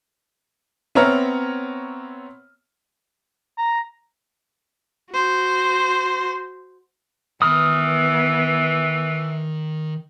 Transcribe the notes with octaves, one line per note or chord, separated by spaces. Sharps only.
B3 C4 C#5 E5 A#5 F6
A#5
F#4 C5
D#3 E3 B3 B5 D#6 F6